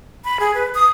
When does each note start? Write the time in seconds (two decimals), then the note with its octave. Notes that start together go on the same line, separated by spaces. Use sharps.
0.24 B5
0.40 G#4
0.54 B4
0.75 D#6